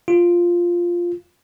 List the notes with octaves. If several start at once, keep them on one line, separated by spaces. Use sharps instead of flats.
F4